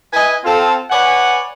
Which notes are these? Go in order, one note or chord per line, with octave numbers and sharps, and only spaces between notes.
E4 B4 D#5 G#5
C4 F4 A4
B4 C#5 D5 F#5 G#5